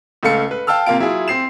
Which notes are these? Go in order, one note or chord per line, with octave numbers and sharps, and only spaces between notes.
C#2 A3 A4 F5 C#7
B4
F5 G5 A5 E6 F6
C3 A#3 F4 F5 D7
F#3 E4 F4 G#4
C4 C7 E7